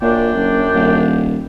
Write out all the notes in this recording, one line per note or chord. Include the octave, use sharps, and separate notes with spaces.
F#2 A#2 D4 G5
F#1
D#1